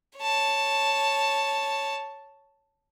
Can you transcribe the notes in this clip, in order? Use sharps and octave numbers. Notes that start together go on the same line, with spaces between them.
C#5 A5